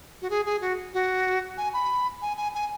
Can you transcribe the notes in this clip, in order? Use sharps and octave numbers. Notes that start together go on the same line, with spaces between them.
F#4
G#4
G#4
F#4
F#4
G#5
B5
G#5
G#5
G#5